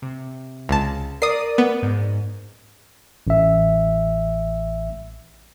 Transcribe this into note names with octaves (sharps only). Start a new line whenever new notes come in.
C3
C#2 A5
A#4 D5 D#6 C7 D#7
B3
G#2
A1 E5